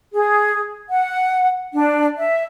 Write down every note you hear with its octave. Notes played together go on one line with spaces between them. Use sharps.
G#4
F#5
D4
E5